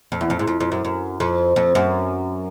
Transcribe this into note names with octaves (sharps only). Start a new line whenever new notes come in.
F2
E2
F2
G#2
F2
F2
F#2
F#2
F2
F2
F#2